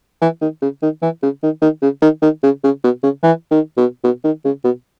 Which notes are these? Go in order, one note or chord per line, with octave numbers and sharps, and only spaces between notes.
E3
D#3
C#3
D#3
E3
C#3
D#3
D#3
C#3
D#3
D#3
C#3
C#3
B2
C#3
E3
D#3
B2
B2
D#3
C#3
B2